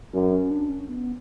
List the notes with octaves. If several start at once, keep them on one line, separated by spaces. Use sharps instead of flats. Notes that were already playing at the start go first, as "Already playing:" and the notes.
F#2 C#4
C#4
D4
C#4
B3